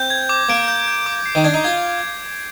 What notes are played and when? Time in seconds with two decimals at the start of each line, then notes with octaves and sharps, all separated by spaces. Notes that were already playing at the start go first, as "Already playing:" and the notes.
Already playing: C4 G6
0.10 G#6
0.29 D6
0.49 A#3 D7
0.68 G6
0.88 G6
1.06 D6
1.26 C7
1.35 D#3
1.44 D4 G#6
1.54 D#4
1.64 F4 G#6